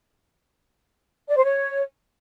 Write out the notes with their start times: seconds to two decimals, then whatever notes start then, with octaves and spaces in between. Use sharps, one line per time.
1.29 D5
1.36 C5
1.44 C#5